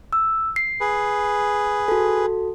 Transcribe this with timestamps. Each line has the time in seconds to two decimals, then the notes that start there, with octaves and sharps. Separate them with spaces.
0.13 E6
0.56 C7
0.81 G#4 B4
1.88 F#4 A4